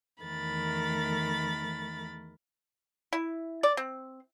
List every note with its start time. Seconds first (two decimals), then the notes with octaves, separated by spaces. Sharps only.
0.22 E2 D#3 A3 A#4 B5 A6
3.13 E4
3.63 D5
3.77 C4